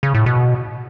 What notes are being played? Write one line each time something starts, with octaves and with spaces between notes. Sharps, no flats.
C#3
A2
B2